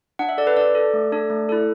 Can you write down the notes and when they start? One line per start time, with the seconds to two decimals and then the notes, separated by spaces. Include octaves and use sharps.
0.19 D4 F#5
0.29 E5
0.38 A4 D5
0.47 B4
0.57 D4 D5
0.75 A4
0.94 A3
1.12 D4 A4
1.30 A3
1.49 E4 A4